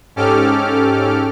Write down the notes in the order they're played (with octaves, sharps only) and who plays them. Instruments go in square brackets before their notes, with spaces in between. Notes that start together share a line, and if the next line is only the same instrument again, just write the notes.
[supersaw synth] G#2 C#4 G4 A4 D6 F6